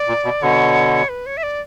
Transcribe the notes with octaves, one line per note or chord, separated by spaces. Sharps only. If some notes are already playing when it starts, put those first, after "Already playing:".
Already playing: D5
A#2
B2
B2 D3 C#5
B4
C#5
E5
D5